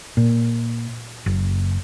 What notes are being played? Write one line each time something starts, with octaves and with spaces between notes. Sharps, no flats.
A#2
F#1